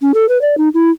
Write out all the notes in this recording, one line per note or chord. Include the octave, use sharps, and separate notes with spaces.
C#4
A4
B4
D5
D#4
E4